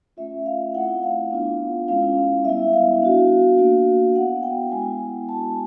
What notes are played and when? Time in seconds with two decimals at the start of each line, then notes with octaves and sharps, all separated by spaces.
0.17 A3 C#4 F4 E5
0.46 F5
0.74 A3 C4 E4 F#5
1.03 F5
1.31 B3 D4 F4
1.88 G#3 C#4 E4 F5
2.45 G3 B3 E4 E5
2.73 F5
3.02 B3 D4 F#4
3.58 A#3 D4 F#4
4.15 B3 E4 F#5
4.43 G5
4.71 G#3 B3 E4 G#5
5.28 G#3 B3 D4 F#4 A5